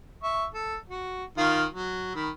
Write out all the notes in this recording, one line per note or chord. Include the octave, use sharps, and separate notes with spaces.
E5 C#6
A4
F#4
D#3 F4
F#3
D#3 B5